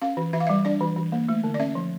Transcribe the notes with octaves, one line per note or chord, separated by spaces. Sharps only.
C#4 F5
E3
E3 E5
F5
E5
G3
D4 D5
E3
E3
A#3
A3
D3
D5
C#4 E5
F3